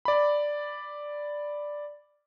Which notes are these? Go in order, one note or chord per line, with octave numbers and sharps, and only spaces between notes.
D5 B5